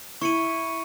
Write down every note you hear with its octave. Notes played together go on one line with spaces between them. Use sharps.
E4 B5 C#6 C#7 D#7